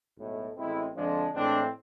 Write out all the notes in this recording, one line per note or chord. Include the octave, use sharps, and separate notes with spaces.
B1 A2 G#3
A1 A2 G#3 C4 E4
F2 D3 F3 G#3 D4
A2 E3 G#3 C4 D4